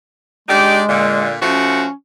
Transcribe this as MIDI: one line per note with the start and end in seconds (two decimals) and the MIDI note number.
0.48 1.25 56
0.48 0.80 62
0.48 0.80 63
0.48 0.80 67
0.88 1.36 46
0.88 1.36 50
1.41 1.84 53
1.41 1.84 57
1.41 1.91 61
1.41 1.84 66